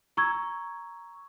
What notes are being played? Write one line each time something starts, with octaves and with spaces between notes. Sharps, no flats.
A#5 C#6 E6 G#6